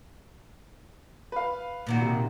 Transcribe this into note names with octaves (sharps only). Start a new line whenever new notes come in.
B4 F5
A#2 D#3 F#4
C3 A#3